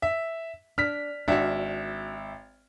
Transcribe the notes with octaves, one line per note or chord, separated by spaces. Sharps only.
E5
D4 F6 B6
G#1 D4 F#4 E5